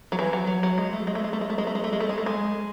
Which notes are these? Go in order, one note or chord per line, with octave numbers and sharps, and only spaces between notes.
F#3
E3
F#3
F#3
F#3
G#3
A3
G#3
A3
G#3
A3
G#3
A3
G#3
A3
G#3
A3
G#3
A3
G#3
A3
G#3